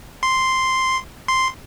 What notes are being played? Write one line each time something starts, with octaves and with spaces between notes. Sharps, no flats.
C6
C6